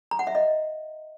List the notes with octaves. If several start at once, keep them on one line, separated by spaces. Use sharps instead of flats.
A#5
F#5
E5
D#5